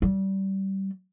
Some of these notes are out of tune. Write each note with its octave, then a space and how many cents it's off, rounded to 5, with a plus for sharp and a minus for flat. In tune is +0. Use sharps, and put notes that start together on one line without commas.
G3 -25